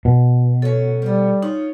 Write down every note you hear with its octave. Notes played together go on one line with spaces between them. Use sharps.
B2
F#3 C#4 A4
F3 G3 B3
C#4 D#4 F4